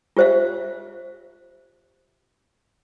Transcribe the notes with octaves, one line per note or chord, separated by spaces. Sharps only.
F4 G4 C5 E5 F5